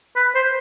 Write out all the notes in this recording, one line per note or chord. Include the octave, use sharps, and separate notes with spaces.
B4
C5